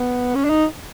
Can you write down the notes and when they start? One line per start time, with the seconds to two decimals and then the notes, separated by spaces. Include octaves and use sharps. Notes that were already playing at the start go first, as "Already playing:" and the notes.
Already playing: B3
0.35 C#4
0.45 D4
0.50 D#4